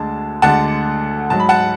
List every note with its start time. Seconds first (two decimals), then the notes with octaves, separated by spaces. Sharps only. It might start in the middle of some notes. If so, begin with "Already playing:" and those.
Already playing: D2 D3 G#3 A5
0.42 D2 D3 G#3 F#5 A5
1.30 G#2 F#3 A5
1.40 B5
1.49 F#5 A5